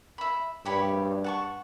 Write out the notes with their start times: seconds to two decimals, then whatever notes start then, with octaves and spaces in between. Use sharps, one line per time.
0.18 E5 B5
0.65 G2 G4 C#5 B5
1.24 F#5 A5 C#6